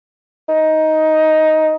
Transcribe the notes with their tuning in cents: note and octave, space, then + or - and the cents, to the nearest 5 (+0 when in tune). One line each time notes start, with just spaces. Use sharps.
D#4 +10